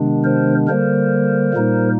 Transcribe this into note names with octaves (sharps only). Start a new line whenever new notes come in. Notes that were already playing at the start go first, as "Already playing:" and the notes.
Already playing: C3 D#3 G#3 B3 D4
A#4 C5
D3 G3 A#3 A#4 C5
A#2 G3 A#3 D#4